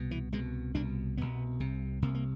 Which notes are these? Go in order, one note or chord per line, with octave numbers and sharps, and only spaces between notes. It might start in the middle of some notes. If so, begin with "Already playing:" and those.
Already playing: C2 B2
E3
C2 B2 G#3
C2 B2 D4
C2 B2 B3
C2 C3
C2 C3 A#3
A#3